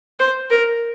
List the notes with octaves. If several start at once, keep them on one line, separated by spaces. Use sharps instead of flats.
C5
A#4